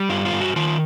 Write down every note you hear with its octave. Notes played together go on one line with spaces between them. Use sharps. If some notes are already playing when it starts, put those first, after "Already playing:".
Already playing: G3
G2 F4
F4
G2
F#4
D#3 F4